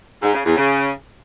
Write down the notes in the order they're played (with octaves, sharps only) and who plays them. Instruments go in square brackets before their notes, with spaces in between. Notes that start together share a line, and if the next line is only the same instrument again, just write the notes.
[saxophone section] G#2
C#3
E2
C#3